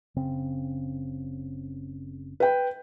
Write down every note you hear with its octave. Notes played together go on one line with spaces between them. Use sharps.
F#1 C#3 C4
B4 G5